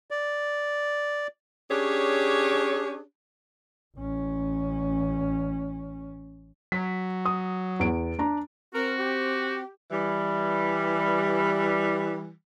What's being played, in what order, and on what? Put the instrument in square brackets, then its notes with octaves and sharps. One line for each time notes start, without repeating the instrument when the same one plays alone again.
[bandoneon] D5
[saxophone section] C#4 D4 G4 G#4 C#5
[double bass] A1 C#4
[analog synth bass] F#3 [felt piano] B6
[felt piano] D#6
E2 D7
D4 A#5
[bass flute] C4 [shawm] F#4 [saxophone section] A#4
[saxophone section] G4
E3 G3